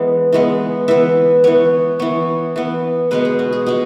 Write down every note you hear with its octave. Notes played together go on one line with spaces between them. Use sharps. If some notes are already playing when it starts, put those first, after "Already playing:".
Already playing: E3 G#3 B3
E3 G#3 B3
E3 B3 E5
E3 B3 C#5
E3 B3 C#5
E3 B3
B2 G#3 B3 B4
G#4
F#4
G#4
B2 G#3 G#4